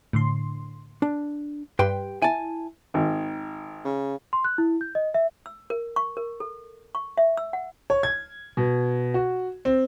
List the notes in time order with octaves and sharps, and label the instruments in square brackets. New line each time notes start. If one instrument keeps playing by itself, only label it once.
[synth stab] A2 D3 C6
[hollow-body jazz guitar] D4
[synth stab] G2 G4 [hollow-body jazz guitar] B4 G5 C6
[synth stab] E4 [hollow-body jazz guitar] G#5 A5
[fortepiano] G#1
[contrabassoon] C#3
[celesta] C6
F#6
E4
G6
D#5
E5
[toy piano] E6
A#4
C#6
A#4
A4
C#6
E5
E6
F#5
[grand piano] C#5
G#6
B2
F#4
C4